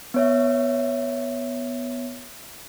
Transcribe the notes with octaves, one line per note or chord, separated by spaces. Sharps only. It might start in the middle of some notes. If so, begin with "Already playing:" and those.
B3 C#5 E5